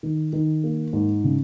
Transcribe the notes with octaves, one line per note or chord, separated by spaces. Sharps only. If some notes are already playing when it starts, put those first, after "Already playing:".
D#3
D#3
A#3
G#2
C#3